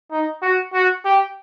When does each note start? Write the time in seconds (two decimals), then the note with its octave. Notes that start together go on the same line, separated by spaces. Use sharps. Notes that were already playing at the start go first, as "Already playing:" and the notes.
0.11 D#4
0.42 F#4
0.73 F#4
1.04 G4